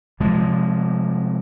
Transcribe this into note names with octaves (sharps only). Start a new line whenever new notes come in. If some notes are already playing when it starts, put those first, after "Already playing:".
C3 F3 G#3